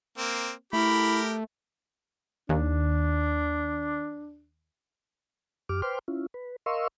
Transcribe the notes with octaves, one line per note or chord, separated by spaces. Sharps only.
A#3 C4
A3 E4 G4 A#4 B5
D#2 D4
F#2 G4 D6 F6
B4 C5 G5 C6 D6 F6
C#4 E4 F4
B4
A#4 D#5 F5 C6 C#6 E6